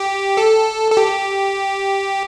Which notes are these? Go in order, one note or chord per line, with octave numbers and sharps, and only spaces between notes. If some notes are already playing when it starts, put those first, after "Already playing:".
Already playing: G4
A4
A4
G4